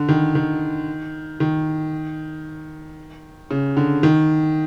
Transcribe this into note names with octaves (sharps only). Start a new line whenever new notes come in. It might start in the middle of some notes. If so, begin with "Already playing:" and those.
Already playing: D3
D#3
D#3
D#3
C#3
D3
D#3